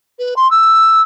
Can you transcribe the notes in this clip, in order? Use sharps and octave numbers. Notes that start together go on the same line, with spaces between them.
B4
C6
E6